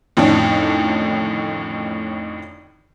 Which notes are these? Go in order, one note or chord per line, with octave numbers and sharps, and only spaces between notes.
F2 A2 D3 D#3 C#4 D4